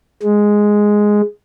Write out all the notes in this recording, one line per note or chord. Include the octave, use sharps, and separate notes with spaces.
G#3